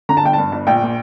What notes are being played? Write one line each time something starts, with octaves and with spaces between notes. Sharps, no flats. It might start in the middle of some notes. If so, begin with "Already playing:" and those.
D3 A#5
A5
G1 G5
G2 A5
G1
A#1 G5
A#2